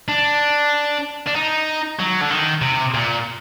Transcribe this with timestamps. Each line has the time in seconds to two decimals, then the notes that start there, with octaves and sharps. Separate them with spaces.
0.09 D4
1.27 D4
1.36 D#4
2.00 F#3
2.21 D3
2.30 D#3
2.62 C3
2.94 A#2